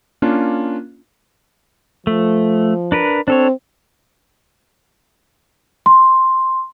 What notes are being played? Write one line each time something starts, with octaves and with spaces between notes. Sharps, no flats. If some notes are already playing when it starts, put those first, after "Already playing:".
A#3 C#4 D4 F4
F3 A3
D4 A#4 B4
C4 D4 A4 C#5
C6